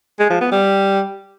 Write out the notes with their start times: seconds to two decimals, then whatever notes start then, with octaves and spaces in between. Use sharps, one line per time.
0.19 G#3
0.30 F3
0.41 B3
0.51 G3